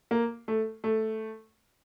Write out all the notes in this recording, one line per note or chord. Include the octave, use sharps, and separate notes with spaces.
A#3
A3
A3